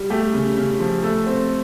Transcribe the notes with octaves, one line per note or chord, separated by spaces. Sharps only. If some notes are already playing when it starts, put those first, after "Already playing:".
Already playing: G3
A3 G4
C#3
C#3
F3
A3 A4
C4